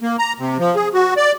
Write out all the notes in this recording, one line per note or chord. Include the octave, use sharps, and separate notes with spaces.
A#3
A#5
C3
F3
G#4
F#4
D5